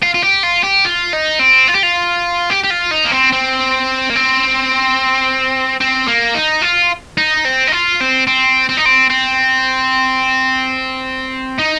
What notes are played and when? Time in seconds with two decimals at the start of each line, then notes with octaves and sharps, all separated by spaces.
0.03 F4
0.14 F4
0.23 G4
0.43 F4
0.64 G4
0.85 F4
1.13 D#4
1.39 C4
1.68 F4
1.75 G4
1.83 F4
2.50 G4
2.64 G4
2.70 F4
2.91 D#4
3.05 A#3
3.12 C4
3.33 C4
4.10 A#3
4.15 C4
5.80 C4
6.08 A#3
6.35 D#4
6.62 F4
7.18 D#4
7.45 C4
7.68 D#4
7.72 F4
8.01 C4
8.27 C4
8.69 C4
8.77 D#4
8.86 C4
9.10 C4
11.58 D#4